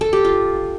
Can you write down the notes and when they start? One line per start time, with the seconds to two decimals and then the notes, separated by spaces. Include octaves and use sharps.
0.01 A4
0.13 G4
0.25 F4